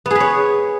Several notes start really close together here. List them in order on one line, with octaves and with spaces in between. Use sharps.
B3 G#4 B4 C#5